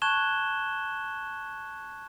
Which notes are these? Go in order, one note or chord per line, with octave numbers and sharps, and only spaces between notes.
A5 C#6 F#6 G#6 E7 G7